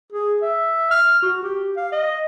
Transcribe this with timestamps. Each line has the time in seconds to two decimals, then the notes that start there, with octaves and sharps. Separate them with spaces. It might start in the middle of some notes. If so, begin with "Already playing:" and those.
0.12 G#4
0.42 E5
0.91 F6
1.22 F#4
1.43 G4
1.76 F5
1.92 D#5